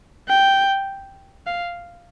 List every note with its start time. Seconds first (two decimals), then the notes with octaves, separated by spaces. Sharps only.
0.29 G5
1.47 F5